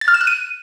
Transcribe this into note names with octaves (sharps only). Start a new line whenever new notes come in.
A6
F6
E7
F#6
D#7